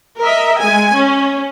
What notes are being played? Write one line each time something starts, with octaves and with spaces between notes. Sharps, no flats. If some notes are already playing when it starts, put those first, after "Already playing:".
A#4 D#5 E5
G#3 G#5
C#4